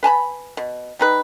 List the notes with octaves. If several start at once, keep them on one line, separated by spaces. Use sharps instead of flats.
B4 G#5 A5 B5
B2
G3 D#4 B4